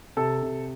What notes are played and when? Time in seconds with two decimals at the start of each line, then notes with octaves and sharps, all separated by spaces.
0.17 C3 A4 A5
0.43 C3